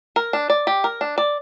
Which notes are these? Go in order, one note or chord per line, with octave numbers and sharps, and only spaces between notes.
A#4
D4
D5
G4
A#4
D4
D5